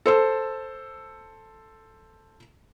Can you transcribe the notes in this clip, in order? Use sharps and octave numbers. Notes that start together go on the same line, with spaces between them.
A4 C5 E6